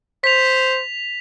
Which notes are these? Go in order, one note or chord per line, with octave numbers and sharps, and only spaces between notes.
C5 B6 F7